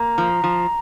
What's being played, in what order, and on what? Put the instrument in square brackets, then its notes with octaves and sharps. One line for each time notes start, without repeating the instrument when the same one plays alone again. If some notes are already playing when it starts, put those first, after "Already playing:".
Already playing: [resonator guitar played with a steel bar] A#3 [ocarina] A#5
[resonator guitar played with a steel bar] F3
F3